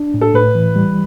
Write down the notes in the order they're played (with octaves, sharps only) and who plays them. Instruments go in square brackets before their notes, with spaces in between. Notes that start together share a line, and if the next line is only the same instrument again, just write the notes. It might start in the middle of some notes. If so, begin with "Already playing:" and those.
Already playing: [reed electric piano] D4
A2
[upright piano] A4
[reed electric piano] A2 [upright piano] B4
[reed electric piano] E3
G3